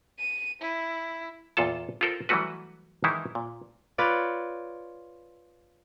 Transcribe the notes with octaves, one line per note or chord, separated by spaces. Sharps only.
D#7
E4
E2 A#2 F4 A4 A5
F4 G4 A4 A#4 C5
E3 F#3 G3 A3 F#4 B4
D#3 E3 G#3 D#4 E4
A#2
F4 B4 C#5 D5